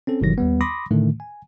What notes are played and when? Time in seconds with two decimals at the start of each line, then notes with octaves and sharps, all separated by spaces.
0.07 C4 C#4 A4
0.21 G1 B2 D#3 E3 F#3 A#6
0.38 D#2 G3 B3
0.61 B5 C6 D6 D#6 A#6
0.91 A2 D3 D#3 A3
1.20 G#5